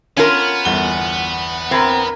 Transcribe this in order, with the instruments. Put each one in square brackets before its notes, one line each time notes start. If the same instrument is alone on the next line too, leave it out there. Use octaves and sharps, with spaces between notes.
[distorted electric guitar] B3 [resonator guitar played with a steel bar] C#4 F4 A#4
[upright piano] G1 E2 G7
[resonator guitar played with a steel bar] C4 [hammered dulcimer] E4 A#4